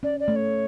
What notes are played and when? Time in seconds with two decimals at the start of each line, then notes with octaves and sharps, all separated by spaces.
0.03 C#4 D5
0.20 D5
0.28 A3
0.36 C#5